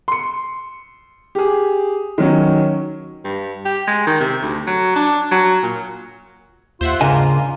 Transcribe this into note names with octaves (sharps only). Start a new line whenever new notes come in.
C6 C#7
G4 G#4
D#3 F#3 C#4
G2
G4
G#3
D#3
C3
D2
F#3
D4
F#3
A#2
D#2 F4 C5 E5 F#5
G#2 C#3 A#3 D4 D#5 G#5